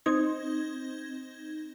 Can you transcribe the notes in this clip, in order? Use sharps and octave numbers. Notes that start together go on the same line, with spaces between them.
C4 D#4 G#6